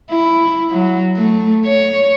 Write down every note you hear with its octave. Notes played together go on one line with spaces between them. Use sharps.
E4
F#3
A3
C#5